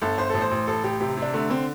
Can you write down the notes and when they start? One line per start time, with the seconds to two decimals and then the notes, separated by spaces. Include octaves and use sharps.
0.02 G1 A4
0.18 G1 C5
0.30 A1 A4
0.41 C5
0.51 A1
0.67 A1 A4
0.84 A1 G4
1.00 C3 G4
1.17 C3
1.22 D4
1.33 D3 A3
1.50 D3 C4